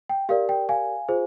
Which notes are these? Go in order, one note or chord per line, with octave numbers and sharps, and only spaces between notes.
G5
G4 A#4 D5 F5
G5
F5 G#5
F4 G#4 C5